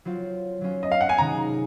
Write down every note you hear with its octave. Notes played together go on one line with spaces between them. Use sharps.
F#3 C4 F4
F#3 C#4 F4
D#5
F5
F#5
G#5
C3 D#3 G#3 D#4 A#5